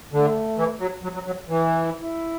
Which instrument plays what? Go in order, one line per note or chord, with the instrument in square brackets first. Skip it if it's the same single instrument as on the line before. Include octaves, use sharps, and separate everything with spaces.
[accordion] D3 [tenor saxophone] A3
[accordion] E3
F#3
F#3
F#3
F#3
E3
[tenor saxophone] E4